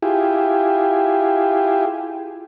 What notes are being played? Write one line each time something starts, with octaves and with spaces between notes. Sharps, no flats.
E4 F4 G4 G#4